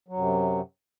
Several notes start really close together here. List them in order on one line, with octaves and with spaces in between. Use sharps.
F#3 F#2 C3